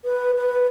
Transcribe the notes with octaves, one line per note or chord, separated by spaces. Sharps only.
B4
B4